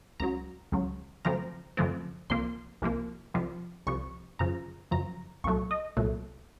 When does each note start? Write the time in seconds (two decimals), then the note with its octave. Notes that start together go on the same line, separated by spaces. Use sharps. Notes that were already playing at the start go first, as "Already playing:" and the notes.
0.20 C#2 C#3 F#3 A#5
0.72 C#2 C#3 F#3
1.25 F#2 C#3 F3 A3 C4 A#5
1.77 F#2 C#3 F3 A3 C4
2.30 C2 C3 F3 A#3 C6
2.82 C2 C3 F3 A#3
3.34 C2 C3 F3
3.87 C2 C3 F3 C#6
4.39 F#2 C#3 F3 A#5
4.91 F#2 C#3 F3 A#5
5.44 C2 A#2 F#3 A3 C#6
5.71 D#5
5.97 C2 A#2 F#3 A3